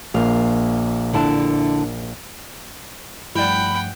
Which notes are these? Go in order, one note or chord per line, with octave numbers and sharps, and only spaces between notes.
A#1 A#3 F5
D3 E4 A5
G2 F3 G3 A3 E4 F#5 G5 B5